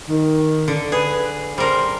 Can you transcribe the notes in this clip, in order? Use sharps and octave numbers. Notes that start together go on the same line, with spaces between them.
D#3
D3
G#4 B4
G3 G#4 A#4 C5